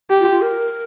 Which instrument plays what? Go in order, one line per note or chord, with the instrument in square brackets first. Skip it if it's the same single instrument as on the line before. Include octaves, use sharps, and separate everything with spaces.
[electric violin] G4
[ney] F4
F4
A#4